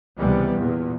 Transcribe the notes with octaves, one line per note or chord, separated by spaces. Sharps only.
C#2 C3 E3 G3 B3
E2 A#2